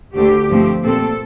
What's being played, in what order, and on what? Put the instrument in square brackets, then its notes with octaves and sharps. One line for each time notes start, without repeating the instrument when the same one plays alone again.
[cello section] D2 D3 A3 G4
G2 F3 A3 C4
A#2 A3 C4 A4